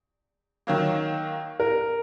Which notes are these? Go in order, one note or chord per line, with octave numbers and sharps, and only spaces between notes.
D#3 F#3 A#3
A#4